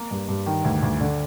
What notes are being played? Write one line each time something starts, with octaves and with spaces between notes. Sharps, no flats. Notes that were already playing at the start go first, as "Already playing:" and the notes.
Already playing: A#3
G2
G2
D#3
D2
D2
D3